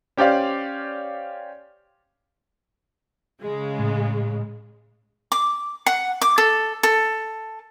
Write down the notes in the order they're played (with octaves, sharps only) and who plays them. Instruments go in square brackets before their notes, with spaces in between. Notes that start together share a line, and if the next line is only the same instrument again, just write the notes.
[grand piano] C#4 G4 C5 D5 F5
[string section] C#3 G#3
[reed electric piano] A2
[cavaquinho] D6
F#5
D6
A4
A4